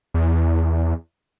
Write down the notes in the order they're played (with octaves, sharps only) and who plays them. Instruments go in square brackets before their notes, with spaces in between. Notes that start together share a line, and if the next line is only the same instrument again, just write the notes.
[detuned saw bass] E2